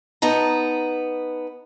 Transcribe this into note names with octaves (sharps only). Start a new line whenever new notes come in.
B3 D#4 A5 A#5